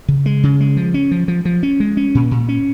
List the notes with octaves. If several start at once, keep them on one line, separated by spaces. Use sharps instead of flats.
C#3
G#3
C#3
G#3
F3
C#4
F3
F3
F3
C#4
G#3
C#4
A#2
A#2
C#4